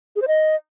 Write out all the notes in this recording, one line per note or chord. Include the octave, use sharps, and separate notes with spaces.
G#4
C5
D#5